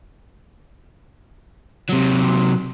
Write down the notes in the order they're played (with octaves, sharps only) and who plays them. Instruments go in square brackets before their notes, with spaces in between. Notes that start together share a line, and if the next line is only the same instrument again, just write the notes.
[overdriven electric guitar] C3 F#3